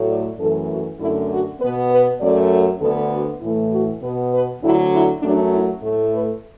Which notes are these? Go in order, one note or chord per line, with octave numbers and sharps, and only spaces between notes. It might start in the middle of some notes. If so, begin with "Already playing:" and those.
Already playing: A2 F#3 A3
D5
F#2 E3 A3 A4
F#4
F#2 D3 A3 E4
F#4
B2 B3 B4
B4
F#2 F#3 A3 D5
D2 D3 B3 A4
F#4
A2 E3 A3 E4
F#4
B2 B3 B4
B4
D2 D3 F#3 E4
E4
F#2 F#3 A3 D4
E4
A2 A3
B4